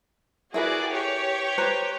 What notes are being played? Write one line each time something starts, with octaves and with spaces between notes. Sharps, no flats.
E4 F#4 G#4 A#4 B4 D5
G4 C#5
B4 C5 A#5